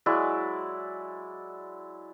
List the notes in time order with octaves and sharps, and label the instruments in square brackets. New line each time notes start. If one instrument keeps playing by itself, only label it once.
[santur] F#3 G#3 E4 D5